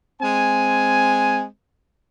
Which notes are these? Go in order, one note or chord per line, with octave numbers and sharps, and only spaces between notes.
G#3 C4 G#5